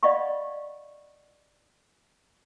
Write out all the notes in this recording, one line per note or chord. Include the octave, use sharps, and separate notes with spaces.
D5 D#5 F5 F#5 B5 C#6